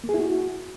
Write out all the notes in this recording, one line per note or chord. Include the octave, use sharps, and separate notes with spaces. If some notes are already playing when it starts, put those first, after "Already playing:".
A#3
G#4
E4
F#4